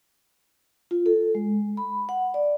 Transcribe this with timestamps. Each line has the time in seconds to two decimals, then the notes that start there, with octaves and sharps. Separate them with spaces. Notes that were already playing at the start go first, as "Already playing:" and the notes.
0.91 F4
1.06 A4
1.35 G#3
1.77 B5
2.09 F#5
2.34 D5